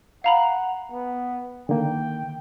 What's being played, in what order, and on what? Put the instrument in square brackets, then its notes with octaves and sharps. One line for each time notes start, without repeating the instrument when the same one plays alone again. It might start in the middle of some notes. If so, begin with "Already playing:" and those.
[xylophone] F5 A#5 B5 [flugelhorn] F#5
[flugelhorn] B3
[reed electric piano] D3 D#3 A#3 [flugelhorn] G5